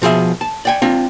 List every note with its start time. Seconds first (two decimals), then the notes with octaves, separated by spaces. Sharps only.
0.02 B2 F3 G#4 E5
0.41 A5
0.65 D5 G5 G#5
0.82 C4 D4 F4